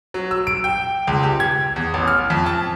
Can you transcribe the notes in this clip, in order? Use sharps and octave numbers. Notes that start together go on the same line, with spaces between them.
F#3
E6
D7
G5
C#2
G4
G#6
E2
A1
F6
F2
A5